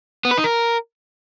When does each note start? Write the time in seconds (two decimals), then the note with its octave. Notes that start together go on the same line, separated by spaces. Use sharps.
0.25 B3
0.31 B4
0.38 D#4
0.44 A#4